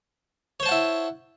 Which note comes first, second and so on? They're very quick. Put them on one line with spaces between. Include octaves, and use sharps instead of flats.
C#5 C5 A5 F#5 E4